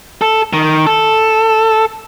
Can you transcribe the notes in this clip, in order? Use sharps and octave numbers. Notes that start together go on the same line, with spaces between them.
A4
D#3
A4